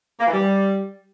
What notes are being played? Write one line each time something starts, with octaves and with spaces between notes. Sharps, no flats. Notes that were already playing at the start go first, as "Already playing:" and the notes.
A#3
E3
G3